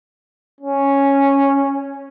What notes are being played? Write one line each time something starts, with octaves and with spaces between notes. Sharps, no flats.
C#4